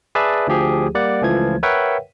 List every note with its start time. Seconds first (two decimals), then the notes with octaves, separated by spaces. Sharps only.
0.15 G#4 B4 D5 E5 A5
0.47 D2 F3 G4 G#4
0.95 G3 A#3 D5 F#5
1.22 C#2 E3 F3 A3 G#6
1.63 A#4 B4 C#5 E5 F#5 G5